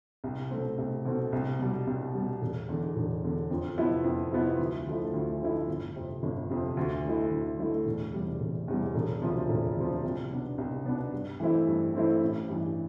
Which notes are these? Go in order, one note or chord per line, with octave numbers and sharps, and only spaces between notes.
C2
B2 A3 C4
C2
B2 A3 C4
C2
B2 G3
C2
B2 G3
E1
E2 D3
E1
E2 D3
F2
C3 F3 B3 E4
F2
C3 F3 B3 E4
D2
D3 F3 A3 E4
D2
D3 F3 A3 E4
G1
F2 C3
G1
F2 C3
D2
D3 A3 E4
D2
D3 A3 E4
E1
E2 C3 G3
E1
E2 C3 G3
E1
D2 C3 F3
E1
D2 C3 F3
C2
B2 B3 D4
C2
B2 B3 D4
G2
E3 A3 C4 E4
G2
E3 A3 C4 E4
A1
G2 E3